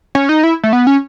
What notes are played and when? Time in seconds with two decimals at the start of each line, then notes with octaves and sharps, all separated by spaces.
0.15 C#4
0.29 D#4
0.43 E4
0.63 A3
0.73 B3
0.87 C#4